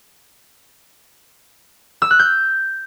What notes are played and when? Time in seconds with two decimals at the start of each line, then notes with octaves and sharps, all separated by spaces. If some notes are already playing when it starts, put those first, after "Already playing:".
2.02 E6
2.11 F#6
2.19 G6